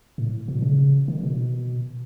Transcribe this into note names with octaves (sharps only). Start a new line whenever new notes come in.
A2
B2
C#3
D#3
B2